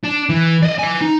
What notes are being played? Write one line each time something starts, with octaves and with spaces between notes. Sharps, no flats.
D4
E3
D5 D#5
B4 G#5
D#4